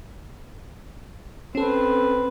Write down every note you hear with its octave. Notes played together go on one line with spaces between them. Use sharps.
C4 C#4 A4 B4